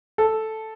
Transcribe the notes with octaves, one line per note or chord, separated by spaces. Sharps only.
A4